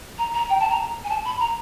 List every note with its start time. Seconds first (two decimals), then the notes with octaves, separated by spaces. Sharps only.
0.18 A#5
0.34 A#5
0.49 G5
0.60 A5
0.70 A#5
1.04 G#5
1.09 A5
1.25 B5
1.40 A#5